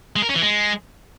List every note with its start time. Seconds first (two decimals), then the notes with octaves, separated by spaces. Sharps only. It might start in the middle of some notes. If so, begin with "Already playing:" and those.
0.16 G#3
0.22 A#4
0.29 C#4
0.36 E3
0.42 G#3